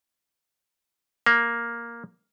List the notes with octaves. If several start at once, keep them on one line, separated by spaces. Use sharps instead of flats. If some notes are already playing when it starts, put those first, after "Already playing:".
A#3